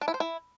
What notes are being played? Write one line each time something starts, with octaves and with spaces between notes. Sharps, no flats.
D4
E4
C5
E4